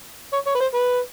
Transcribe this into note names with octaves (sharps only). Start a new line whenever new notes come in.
C#5
C#5
B4
C5
B4